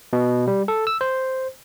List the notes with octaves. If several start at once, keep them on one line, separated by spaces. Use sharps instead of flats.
B2
G3
A4
E6
C5